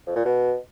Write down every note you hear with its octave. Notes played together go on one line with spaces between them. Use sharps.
F2
A#2
B2